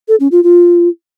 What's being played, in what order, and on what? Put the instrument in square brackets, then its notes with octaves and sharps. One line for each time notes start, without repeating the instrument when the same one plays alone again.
[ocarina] A4
C#4
F4
F4